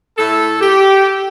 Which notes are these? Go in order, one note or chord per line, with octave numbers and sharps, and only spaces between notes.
A2 A3 A4
G4